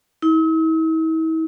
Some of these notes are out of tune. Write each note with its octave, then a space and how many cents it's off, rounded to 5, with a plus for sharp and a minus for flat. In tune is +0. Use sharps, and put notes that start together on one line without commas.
E4 -45